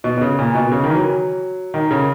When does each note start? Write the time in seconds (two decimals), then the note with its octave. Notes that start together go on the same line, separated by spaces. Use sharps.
0.04 B2
0.17 B2
0.21 C#3
0.39 A#2
0.55 B2
0.72 C#3
0.84 D#3
0.90 E3
0.94 F#3
1.74 D#3
1.91 C#3